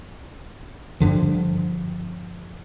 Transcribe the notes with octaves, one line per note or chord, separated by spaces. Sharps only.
G2 D3 F3